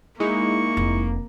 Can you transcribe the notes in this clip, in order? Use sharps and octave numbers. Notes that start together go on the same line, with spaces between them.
G#3 A#3 D#4 E4 C#6
F1